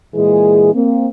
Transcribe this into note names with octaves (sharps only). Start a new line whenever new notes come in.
A#2 E3 G#3 G#4
A#3 C4